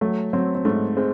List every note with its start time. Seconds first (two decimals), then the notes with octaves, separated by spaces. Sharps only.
0.01 F#3 A3
0.33 F#3 C4
0.55 C4
0.65 G#2 A3
0.97 G#3 C4